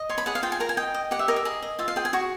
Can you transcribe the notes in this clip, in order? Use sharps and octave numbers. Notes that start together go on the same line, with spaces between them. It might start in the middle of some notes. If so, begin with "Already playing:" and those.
Already playing: D#5
C#5 C6
B5
G#4 F#5
F5
F4 G5
G#5
A#4 A#5
G#5
D#5 G5
D#5
G4 F#5
E5
A#4 D#5
E5
G#4 D#5
D#5
F4 E5
F5
G#4 G5
G#5
F#4 C#6